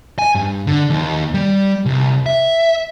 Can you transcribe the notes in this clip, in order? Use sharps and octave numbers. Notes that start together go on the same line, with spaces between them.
G#5
G2
D3
D#2
G3
C2
E5